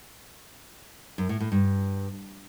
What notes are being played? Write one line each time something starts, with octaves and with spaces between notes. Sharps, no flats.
F#2
A2
A2
G2